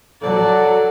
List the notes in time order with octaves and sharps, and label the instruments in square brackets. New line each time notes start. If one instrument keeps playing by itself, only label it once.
[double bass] F#3 [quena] A4 [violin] D5 F#5